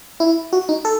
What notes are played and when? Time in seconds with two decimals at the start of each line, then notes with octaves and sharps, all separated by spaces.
0.20 E4
0.53 F#4
0.69 D#4
0.85 A4